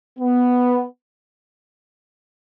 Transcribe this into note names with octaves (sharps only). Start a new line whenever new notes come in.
B3